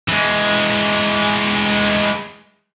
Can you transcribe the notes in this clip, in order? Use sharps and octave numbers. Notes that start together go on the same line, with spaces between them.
E3 G#3